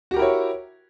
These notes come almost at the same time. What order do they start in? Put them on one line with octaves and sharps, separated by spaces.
F#4 G4 A#4 E4 C#5